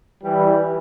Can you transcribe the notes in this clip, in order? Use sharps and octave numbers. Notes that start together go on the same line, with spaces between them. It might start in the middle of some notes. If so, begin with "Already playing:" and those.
E3 G3